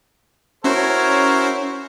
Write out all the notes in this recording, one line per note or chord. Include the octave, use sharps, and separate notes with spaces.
C#4 E4 F#4 A#4 C5 C#5